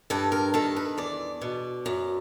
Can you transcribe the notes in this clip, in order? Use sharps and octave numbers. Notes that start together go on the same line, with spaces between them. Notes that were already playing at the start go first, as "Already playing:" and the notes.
G2 A4
A#4
D#3 A4
B4
E2 D5
B2
F#2